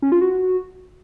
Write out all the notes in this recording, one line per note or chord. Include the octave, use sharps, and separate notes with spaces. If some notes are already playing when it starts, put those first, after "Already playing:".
C#4
F4
F#4